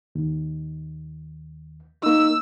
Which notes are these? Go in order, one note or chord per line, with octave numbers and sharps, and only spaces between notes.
D#2
A#3 D#4 E6